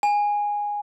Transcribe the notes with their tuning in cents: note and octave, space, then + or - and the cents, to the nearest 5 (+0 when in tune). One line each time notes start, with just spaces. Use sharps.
G#5 -10